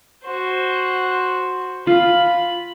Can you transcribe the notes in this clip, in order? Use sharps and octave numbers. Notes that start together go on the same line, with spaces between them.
F#4 C5
F4 B5